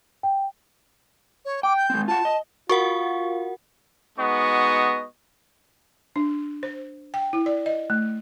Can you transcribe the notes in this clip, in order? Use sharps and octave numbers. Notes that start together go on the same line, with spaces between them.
G5
C#5
G5 D6
G6
G#3 C4
F4 F#5 A5
D#5
F4 F#4 A#4 F#5 C#6
G#3 B3 D#4 F#4 D#5 C#6
D4
C5
G5
E4
D5
D#5
A3